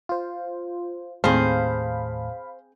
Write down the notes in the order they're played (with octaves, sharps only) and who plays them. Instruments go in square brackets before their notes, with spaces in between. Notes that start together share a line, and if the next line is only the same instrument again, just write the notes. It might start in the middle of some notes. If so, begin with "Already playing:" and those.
[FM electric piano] F4 C5
[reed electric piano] D#2 A2 A5 [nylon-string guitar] C4 G#4 [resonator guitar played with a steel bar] C5 [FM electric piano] F5 B5